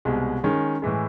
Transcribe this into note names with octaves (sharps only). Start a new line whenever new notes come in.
C2 B2 G#3
D#3 G#3 C#4
A2 E3 G#3